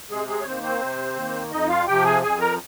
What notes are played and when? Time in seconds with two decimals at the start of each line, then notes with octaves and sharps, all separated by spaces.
0.09 C3 G#3 G#4
0.27 G#3 G#4
0.41 C#5
0.45 D#3 A#3 C4 C5
0.63 C4 C5
0.81 C3
1.16 D#3 A#3
1.51 F2 D#4 D#5
1.69 F4 F5
1.87 C3 F3 G4 G5
2.04 G#4 G#5
2.23 F2 G#4 G#5
2.40 A#4 A#5